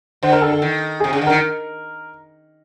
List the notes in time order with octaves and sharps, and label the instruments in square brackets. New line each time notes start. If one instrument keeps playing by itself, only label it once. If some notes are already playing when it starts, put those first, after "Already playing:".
[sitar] D3 [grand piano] C5
[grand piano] A#4
A4
A4
[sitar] D#3
[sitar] C3 [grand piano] G#4
[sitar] C#3
D3
[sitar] D#3 [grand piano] A#4